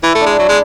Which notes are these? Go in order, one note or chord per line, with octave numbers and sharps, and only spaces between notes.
E3 E4
A3
D4
G#3
F#3
G#3